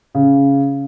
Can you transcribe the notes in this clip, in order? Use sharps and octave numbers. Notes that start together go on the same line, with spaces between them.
C#3